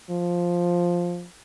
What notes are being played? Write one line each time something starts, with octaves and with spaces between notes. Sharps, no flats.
F3